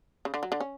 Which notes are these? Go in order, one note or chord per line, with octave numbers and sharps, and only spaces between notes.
C#3
D3
F#3
D3
C#4